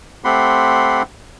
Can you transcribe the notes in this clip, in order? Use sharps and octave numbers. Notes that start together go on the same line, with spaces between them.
A3 C4 G4 F#5 B5 C6